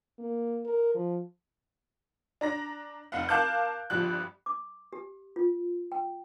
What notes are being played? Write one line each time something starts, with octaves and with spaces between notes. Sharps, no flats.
A#3
A#4
F3
D4 A#5 A#6
F1 F5 F#5
A#4 F5 A5 D6 F#6 G6
G1 G2 F3 F#6
D6
G4
F4
G5